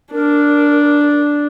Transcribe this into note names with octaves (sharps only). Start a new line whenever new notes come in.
D4 A#4